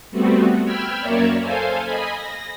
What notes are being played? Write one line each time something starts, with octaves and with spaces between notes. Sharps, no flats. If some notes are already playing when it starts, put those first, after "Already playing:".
G3 A3 B3 C4 F#4
G5 B5 E6 F6 G#6
F#2 A#3 A#4 C#5 D5 E5
A4 C5 F5 G#5
D#5 G#5 B5
A#6